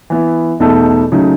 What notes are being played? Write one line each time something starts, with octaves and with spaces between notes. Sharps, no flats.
E3 B3 E4
E2 B2 A3 D#4 A4
C#3 F#3 A3 D#4